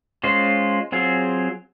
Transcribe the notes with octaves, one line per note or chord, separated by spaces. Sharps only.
G#3 C#4 F4 C5
F#3 C4 F4 G#4